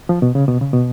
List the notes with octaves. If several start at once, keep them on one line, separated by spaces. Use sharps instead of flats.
F3
B2
C#3
B2
C#3
B2